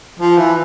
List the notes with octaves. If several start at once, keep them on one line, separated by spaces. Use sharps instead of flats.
F3
E3